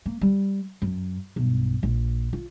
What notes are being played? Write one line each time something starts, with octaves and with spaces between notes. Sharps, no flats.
A#3
G3
F#2
B1 G2
A#1
F4